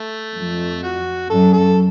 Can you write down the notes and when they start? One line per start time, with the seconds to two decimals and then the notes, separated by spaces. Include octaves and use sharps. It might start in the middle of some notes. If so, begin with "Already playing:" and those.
Already playing: A3
0.36 F2
0.83 F#4
1.30 F#2 A4
1.53 A4